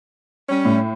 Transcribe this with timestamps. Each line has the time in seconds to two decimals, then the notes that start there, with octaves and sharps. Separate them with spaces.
0.49 G3 C#4
0.65 A2